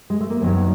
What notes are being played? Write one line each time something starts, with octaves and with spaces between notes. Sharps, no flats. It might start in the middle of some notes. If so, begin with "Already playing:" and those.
G#3
A3
A#3
F#2 D#3 F#3 B3